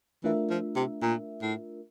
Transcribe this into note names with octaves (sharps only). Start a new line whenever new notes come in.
E3 A3 D4 F4 A#4 E5
F3
C3
A#2
A2